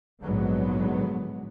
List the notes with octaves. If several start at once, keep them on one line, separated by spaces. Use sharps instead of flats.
A#1 G#2 D3 F#3 G#3 B3